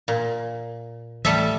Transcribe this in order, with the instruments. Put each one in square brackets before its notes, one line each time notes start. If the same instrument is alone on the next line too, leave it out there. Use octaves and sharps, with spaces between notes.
[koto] A#2
[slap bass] E3 A3 [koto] G3 A4 E5